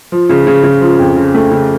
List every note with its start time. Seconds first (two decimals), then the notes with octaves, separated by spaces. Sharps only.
0.12 F3
0.29 C#3
0.47 C#3
0.63 C#3
0.81 F3
0.99 F2
1.16 C#3
1.34 A3
1.52 C#3